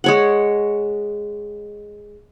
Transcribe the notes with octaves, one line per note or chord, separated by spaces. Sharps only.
G#3 C#5 F#5